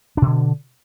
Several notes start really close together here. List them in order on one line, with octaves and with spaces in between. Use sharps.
D4 B2 D3